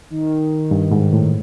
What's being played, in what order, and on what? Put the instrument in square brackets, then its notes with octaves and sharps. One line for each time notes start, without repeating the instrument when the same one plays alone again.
[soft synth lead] D#3
[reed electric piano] G2
G#2
A2